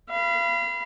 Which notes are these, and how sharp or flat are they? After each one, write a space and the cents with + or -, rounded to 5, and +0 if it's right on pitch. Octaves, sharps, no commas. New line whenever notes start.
F5 -35 B5 +0